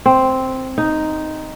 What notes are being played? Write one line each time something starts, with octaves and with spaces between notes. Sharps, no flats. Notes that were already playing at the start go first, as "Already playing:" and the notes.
C4
D#4